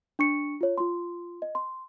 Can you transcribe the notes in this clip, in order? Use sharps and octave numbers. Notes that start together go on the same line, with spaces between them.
D4 C#6 C#7
F4 C#5
F4 C6
D#5
C6